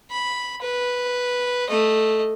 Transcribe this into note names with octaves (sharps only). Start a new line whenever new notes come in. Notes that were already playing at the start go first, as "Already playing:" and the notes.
B5
B4
A3 D#5